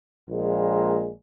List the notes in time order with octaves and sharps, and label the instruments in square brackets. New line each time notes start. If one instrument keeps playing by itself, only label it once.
[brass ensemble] A#1 A#2 G#3